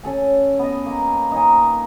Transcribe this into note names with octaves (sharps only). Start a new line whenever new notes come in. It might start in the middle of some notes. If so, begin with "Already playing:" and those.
C#4 A4 G#5
B3 D#5
A#3
D#4 G#5